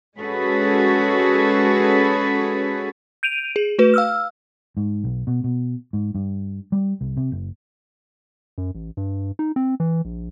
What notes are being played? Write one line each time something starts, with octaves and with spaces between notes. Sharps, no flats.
G#3 C#4 F#4 G#4 A4 B4
G6 D7 D#7 F7
G#4
A3 F#4 B4
F5 E6 F6
G#2
B1
B2
B2
G#2
G2
G3
C2
C3
F#1
F#2
A1
G2
D#4
C4
E3
A#1